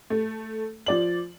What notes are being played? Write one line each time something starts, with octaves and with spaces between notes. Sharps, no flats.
A3
F3 D5 F#7